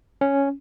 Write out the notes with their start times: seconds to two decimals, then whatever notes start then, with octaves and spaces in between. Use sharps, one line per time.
0.21 C#4